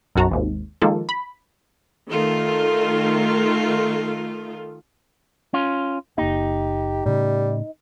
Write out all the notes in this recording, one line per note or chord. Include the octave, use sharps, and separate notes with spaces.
B1 F#2 F#4 A5 A#5
G#1 D#2 G#2
D#3 F3 G#3 A#3 F4 A4
B5
D#3 A3 F4 A4
C#4 F4
F#1 A#3 D#4 G4
A2 C#3 G3